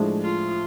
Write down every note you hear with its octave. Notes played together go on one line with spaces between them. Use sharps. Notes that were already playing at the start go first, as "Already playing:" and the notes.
Already playing: A2 F3 G#3 D4 G#4
F4